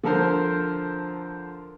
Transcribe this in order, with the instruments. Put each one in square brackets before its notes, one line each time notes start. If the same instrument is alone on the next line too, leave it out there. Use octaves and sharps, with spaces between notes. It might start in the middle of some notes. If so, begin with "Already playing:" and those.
[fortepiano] D3 F3 A4 A#4 C5